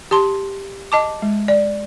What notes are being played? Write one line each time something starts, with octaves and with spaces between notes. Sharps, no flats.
G4 A5 C6
D#5 A5 D6
G#3
D5